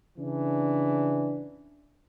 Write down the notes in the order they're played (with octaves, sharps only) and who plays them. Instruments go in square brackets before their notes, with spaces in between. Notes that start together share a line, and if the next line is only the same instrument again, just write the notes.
[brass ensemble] C#3 E3 D4